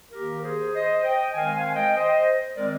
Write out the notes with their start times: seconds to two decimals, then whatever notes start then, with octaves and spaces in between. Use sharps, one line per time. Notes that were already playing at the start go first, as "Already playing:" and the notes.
0.12 D#3 A#3 G4 A#4
0.42 G#4 C5
0.73 C5 D#5
1.04 D#5 G5
1.34 D#3 G#3 C4 F5 G#5
1.54 F5 G#5
1.75 D#5 G5
1.96 C5 D#5
2.56 D#3 G#3 C4 A#4 D5